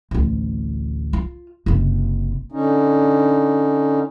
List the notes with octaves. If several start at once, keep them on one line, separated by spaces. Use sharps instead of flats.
A1 D2
F4
F#1 C3
D3 C#4 D#4